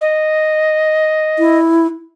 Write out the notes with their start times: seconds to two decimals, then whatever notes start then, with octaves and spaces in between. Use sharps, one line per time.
0.01 D#5
1.39 E4